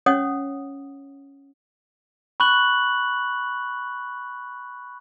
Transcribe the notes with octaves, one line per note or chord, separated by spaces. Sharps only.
C#4 C#5 F#5 D#6
B5 C#6 F#6 F#7